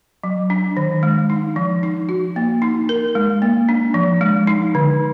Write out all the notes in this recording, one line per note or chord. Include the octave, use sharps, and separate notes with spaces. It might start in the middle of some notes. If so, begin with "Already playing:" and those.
F#3
D4
D#3
G#3
D#4
F3
D#4
F#4
A#3
D#4
A#4
G#3
A#3
D4
F3
G#3
D#4
D3